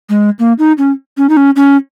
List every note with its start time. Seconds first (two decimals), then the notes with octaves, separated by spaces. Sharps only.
0.09 G#3
0.39 A#3
0.59 D#4
0.78 C#4
1.17 C#4
1.29 D#4
1.37 C#4
1.56 C#4